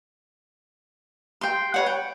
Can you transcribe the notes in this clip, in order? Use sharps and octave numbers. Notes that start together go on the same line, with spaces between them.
G5 C6
B4 C#5 F#5
G5